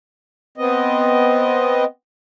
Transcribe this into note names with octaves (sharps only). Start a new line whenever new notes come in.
B3 C4 D#5